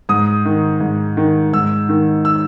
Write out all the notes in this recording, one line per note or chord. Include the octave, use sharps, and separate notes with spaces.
G#2 D#6
D#3
G#2
D#3
G#2 E6
D#3
E6